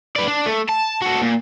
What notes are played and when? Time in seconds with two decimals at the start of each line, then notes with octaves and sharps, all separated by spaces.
0.16 B4 D5
0.28 D4
0.46 A3
0.69 A5
1.02 F#4 A4
1.22 A#2